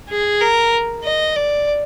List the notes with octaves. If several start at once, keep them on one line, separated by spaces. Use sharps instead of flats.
G#4
A#4
D#5
D5